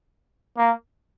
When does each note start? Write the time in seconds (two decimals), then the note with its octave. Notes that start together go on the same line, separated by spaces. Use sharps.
0.57 A#3